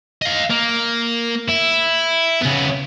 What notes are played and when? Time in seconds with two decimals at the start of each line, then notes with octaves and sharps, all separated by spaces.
0.22 D#5 F5
0.50 A#3
1.49 E4
2.41 C#3 B3